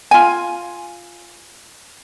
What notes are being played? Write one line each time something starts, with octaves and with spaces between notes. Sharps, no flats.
F4 G#5